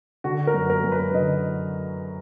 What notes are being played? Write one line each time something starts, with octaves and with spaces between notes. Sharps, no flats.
D3 F#4
A#4
F#2
A#4
F#2
B4
D3 D#5